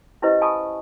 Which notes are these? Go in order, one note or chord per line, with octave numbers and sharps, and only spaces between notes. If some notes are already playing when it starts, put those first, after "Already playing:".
C#4 E4 G4 B4 C5 D#5
F5 G#5 A5 B5 C#6 D#6